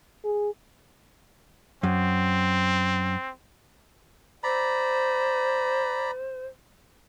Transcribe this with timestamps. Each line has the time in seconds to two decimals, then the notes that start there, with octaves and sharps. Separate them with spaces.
0.24 G#4
1.83 F#2 C4
4.43 C5 D5 A#5 B5